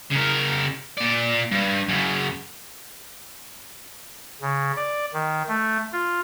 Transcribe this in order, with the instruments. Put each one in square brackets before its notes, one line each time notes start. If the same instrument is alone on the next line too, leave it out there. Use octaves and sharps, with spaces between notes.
[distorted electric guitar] C#3 A#4
A#2 D5
G2
F#2 C#3
[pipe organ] C#3
D5
D#3
A3
F4